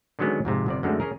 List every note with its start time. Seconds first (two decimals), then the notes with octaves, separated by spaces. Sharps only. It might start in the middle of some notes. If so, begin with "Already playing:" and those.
0.19 D3 D#3 F#3 G#3 B3 C#4
0.45 F2 G#2 C3
0.66 G1 C3 D5
0.83 F#2 D3 G#3 A3 C4
1.00 C#4 G#4 A#4